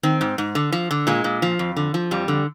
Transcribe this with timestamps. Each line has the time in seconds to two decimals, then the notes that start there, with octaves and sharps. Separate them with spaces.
0.03 D#3 C4
0.21 G#2
0.38 G#2
0.55 D3
0.72 F3
0.91 D3
1.07 A#2 G#3
1.24 A#2
1.42 F3
1.59 F2
1.77 D3
1.94 F3
2.11 F2 G3
2.28 D3